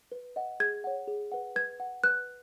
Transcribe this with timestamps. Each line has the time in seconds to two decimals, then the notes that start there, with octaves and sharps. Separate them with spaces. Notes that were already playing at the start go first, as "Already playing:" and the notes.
0.12 B4
0.36 D#5 F#5
0.60 G#4 G#6
0.84 C#5 F#5
1.08 G#4
1.32 B4 F#5
1.56 B4 G#6
1.80 F#5
2.03 B4 F#6